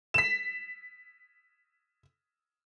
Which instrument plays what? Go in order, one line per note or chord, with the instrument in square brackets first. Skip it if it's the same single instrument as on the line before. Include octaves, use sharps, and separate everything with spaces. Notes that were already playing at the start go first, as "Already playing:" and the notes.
[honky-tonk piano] B6 E7